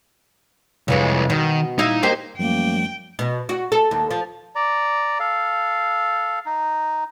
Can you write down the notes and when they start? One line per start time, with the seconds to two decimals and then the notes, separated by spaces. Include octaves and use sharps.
0.88 C2 F2 E3 G#3 C#5
1.30 B2 D#3
1.78 A#2 D#4 E4 F5
2.03 A#3 D#4 G4 C5
2.39 F#2 F3 G3 A3 A#3 G5
3.19 B2
3.49 F#4
3.72 A4
3.91 D#2
4.11 F3
4.55 D5 A#5
5.20 A4 F5
6.46 D#4